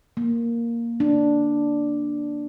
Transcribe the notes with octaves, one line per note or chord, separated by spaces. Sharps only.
A#3
D4